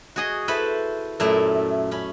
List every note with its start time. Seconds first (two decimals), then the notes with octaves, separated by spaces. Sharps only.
0.16 F#4 G#4 D#5
0.48 E4 A4 B4 C5 B5
1.20 F#2 A#2 A3 E4
1.91 C#4 B5